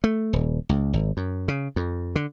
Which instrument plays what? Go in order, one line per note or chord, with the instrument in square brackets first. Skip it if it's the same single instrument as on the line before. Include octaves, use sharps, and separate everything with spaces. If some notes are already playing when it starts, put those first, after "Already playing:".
[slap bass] A3
D#1
C#2
G#1
F#2
C#3
F2
D3